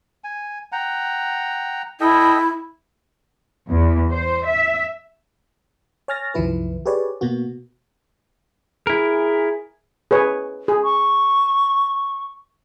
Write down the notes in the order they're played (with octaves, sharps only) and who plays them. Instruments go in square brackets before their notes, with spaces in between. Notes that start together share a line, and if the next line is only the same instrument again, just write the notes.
[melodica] G#5
F#5 G5 A#5
[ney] E4 [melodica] A4 D#5 G5
[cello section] E2
C5
E5
[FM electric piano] C#5 G#5 F6 A6 A#6
C2 F#2 D#3 F3 E4 B4
G4 G#4 B4 C#5 D5
B2 A#3 B3 F#4
[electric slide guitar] E4 A#4 [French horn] G#4
[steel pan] G#4 B4 C#5
G#4
[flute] C#6